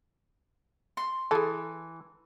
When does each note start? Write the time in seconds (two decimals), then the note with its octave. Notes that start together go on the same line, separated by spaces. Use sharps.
0.97 C6
1.31 E3 G#4 A4